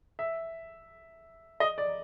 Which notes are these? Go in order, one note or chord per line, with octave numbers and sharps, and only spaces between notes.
E5
D#5
D5